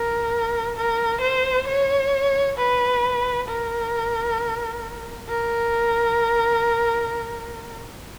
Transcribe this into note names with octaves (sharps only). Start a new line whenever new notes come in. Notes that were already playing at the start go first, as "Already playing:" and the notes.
Already playing: A#4
A#4
C5
C#5
B4
A#4
A#4